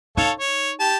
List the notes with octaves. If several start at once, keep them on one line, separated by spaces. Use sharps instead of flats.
D#4 A4 C#5 F5
C#5
G4 A5